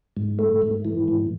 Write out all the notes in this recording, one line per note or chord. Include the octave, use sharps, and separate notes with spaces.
G#2
A3
G#2
E3
G#2